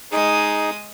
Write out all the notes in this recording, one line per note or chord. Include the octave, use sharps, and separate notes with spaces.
G#3 D#4 G#4 D#6